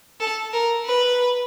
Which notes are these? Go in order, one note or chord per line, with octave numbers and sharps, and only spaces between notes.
A4
A#4
B4